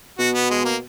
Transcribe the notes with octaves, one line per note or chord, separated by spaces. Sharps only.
B2 F#4
B3
G#3
A#3